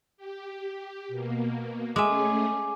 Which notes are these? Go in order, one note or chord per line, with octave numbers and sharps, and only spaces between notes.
G4
B2 A#3
G#3 A3 C#4 G#4 E5 G#5 D6